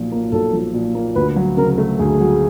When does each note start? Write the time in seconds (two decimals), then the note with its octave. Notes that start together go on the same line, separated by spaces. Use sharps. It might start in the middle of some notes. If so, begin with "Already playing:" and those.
Already playing: B1 A#2 F3
0.12 A#3
0.32 B1 A4
0.53 F3
0.74 A#2
0.95 A#3
1.16 D2 B4
1.36 F#3
1.57 C#3 A#4
1.78 A3
1.99 D2 G#4
2.21 F#3